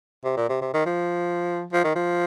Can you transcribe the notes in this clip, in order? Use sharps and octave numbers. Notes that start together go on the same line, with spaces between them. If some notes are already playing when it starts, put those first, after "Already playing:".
C3
A#2
C3
C3
D#3
F3
F3
D#3
F3